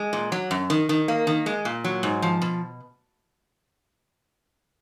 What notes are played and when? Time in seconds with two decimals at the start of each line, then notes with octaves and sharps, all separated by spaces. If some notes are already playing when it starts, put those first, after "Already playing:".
Already playing: G#3
0.13 A#2
0.32 F#3
0.51 F#2
0.70 D#3
0.89 D#3
1.08 A#3
1.27 D#3
1.46 G#3
1.65 A#2
1.84 F#3
2.03 G#2
2.22 F3
2.42 B2